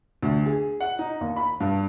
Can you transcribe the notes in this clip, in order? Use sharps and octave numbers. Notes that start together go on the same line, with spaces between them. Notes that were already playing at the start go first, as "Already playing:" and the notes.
D2
G#4
F#5
D#4
D#2
B5
G2